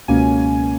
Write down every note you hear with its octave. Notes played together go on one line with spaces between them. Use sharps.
C#2 B2 A#3 C#4 G#5